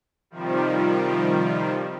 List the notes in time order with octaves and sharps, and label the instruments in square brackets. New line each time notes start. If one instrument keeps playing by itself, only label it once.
[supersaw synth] C3 D#3 F3 G3